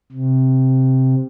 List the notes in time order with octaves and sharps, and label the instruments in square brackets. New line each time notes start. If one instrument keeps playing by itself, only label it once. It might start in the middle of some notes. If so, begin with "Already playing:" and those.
[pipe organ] C3